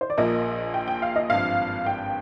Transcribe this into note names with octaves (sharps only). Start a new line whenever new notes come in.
C5
D5
A#1 A#2 F3 A#3 D#5
G5
G5
F5
D#5
G#1 G2 F3 F5
G5